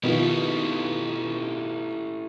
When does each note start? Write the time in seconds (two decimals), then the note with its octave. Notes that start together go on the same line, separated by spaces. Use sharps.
0.03 B2 D#3 F3 A3 E4 G4